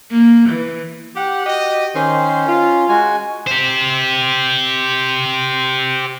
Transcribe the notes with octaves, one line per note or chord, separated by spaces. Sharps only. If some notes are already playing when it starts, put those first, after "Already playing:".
A#3
E3
G4 F#5
F#4 G4 D#5
D#3 C#4 C5
F4
G#3 F#4 G#5
G4 C5